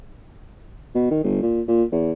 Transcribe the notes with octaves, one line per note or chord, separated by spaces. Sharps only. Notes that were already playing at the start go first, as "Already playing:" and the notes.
B2
D#3
G1
A#2
A#2
E2